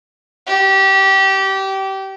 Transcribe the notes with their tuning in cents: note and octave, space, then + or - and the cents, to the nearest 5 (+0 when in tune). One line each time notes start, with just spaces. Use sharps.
G4 -20